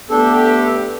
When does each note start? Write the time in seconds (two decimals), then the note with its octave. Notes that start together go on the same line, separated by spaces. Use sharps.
0.10 A3 B3 D4 G4 A4